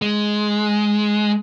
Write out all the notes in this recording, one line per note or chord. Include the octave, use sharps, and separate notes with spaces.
G#3